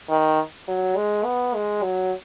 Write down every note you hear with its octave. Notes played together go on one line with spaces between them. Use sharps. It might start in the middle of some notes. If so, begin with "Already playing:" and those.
D#3
F#3
G#3
B3
G#3
F#3